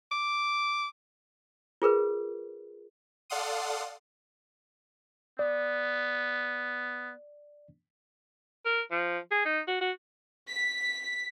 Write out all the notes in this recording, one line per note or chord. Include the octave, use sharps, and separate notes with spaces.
D6
F4 G#4 A#4 B4
A4 D5 F5 F#5 C6 D#6
B3 D5
A#4
F3
G#4
D#4
F#4
F#4
B6